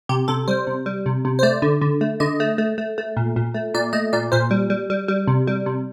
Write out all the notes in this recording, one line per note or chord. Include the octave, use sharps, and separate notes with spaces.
C3 G4
C3 A4
G3 C5
C3
G3
C3
C3
C5
A3 D5
D3
D3
A3
D3 D#5
A3
A3
A3
A3
A#2
A#2
A3
A#2 D5
A3 D#5
A#2 D5
A#2 C5
G3
G3
G3
G3
C3
G3
C3